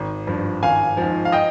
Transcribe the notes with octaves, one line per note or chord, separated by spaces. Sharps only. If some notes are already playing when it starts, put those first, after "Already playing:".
Already playing: G#1
G2 F3
G#1 F5 G#5
G#2 F3
F5
D#5 G5